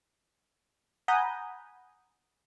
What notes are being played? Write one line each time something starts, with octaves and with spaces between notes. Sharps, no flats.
F#5 G#5 A#5 B5 D#6 G6